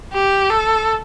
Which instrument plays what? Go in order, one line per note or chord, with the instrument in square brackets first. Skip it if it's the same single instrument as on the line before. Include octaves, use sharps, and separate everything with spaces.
[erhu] G4
A4